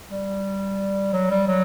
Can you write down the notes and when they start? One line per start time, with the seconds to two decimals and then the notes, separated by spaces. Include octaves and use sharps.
0.11 G3
1.13 F#3
1.30 G3
1.48 F#3